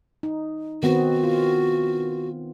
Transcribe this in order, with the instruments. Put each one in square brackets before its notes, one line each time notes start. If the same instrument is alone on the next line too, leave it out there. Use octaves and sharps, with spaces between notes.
[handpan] D#4
[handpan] D#3 B3 C4 [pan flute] F#4
[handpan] F4